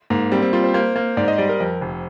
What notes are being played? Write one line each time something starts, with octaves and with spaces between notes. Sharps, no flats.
G#2 A#3
G3 C4
C4
G3 F4
C5
A#3 C5
A#3
G#2 D5
D#5
G3 D5
A#4
F2
F1